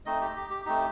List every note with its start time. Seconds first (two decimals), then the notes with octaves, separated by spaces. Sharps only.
0.06 A3 C4 D#4 D#5
0.21 G4
0.36 G4
0.50 G4
0.65 A3 C4 D#4 G4